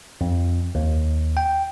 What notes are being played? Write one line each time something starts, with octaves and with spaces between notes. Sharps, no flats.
F2
D#2
G5